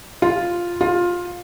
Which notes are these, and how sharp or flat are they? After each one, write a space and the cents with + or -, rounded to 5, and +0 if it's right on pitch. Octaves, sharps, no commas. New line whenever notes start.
F4 +0
F4 +15